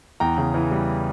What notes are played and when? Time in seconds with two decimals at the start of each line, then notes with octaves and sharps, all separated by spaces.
0.20 E2 G5 A#5
0.38 C#3
0.54 E3
0.71 G3